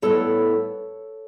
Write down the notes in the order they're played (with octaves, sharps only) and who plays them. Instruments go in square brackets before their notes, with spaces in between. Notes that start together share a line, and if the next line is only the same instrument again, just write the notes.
[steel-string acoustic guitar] A2 G3 B3 E4 A4 C#5